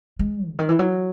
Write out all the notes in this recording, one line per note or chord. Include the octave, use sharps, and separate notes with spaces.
G#3
C#3
D#3
E3
F#3